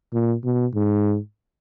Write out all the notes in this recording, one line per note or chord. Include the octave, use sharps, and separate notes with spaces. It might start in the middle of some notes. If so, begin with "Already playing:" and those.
A#2
B2
G#2